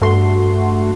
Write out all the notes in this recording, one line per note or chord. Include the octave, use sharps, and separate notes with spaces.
G2 A3 F#4 C6